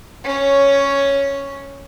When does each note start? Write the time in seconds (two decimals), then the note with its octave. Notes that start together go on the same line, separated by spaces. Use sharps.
0.24 C#4 C#5